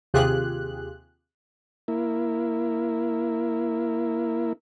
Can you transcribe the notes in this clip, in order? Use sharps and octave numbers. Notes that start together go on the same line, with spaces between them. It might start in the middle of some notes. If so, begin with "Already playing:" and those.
D#2 C3 F4 G4 G#4 F#6
A#3 E4